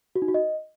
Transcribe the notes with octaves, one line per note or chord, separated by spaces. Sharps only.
F#4
D#4
F#4
D#5